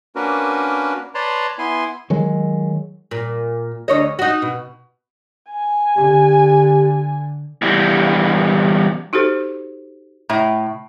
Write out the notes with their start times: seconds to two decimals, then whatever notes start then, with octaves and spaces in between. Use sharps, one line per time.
0.16 A#3 C#4 D4 F#4 A#4 B4
1.15 B4 C#5 D5 A5 A#5 C6
1.59 B3 E4 G#5 C6
2.10 D#3 F#3 G#3
3.11 A#2
3.88 D2 C#5 D#5
4.19 D#4 F#4
4.42 B2
5.50 G#5
5.96 D3 G4
7.62 E2 G3
9.13 D#4 F#4 G4 A4 C5
10.30 A2